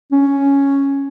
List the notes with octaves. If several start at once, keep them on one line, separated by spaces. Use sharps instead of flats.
C#4